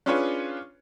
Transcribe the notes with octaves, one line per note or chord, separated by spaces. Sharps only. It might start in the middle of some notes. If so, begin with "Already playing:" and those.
C#4 D4 F4 G#4 B4 C#5